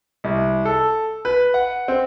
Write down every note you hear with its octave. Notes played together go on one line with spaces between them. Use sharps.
C2
A4
B4
F#5
C4